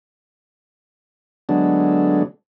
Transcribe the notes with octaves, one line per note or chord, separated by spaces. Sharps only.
D3 F#3 G#3 A3 B3 D4